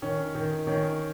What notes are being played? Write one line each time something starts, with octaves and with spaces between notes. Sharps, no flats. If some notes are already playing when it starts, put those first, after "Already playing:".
D#3 C#4
D#3
D#3 C#4